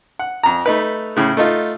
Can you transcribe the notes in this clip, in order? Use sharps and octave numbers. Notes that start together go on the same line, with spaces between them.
F#5
F2 A#5
A3 D#4 B4
A2 C#3
A3 D#4 F4